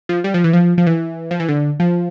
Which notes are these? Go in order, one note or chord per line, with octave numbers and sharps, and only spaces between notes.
F3
G3
F3
E3
F3
F3
E3
F3
E3
D3
F3